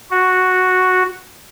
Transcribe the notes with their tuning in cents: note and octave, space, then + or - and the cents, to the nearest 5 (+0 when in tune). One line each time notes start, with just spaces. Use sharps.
F#4 -5